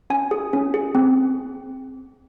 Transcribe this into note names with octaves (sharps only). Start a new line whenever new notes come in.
C#4 G#5
G#4
C#4
G#4
C4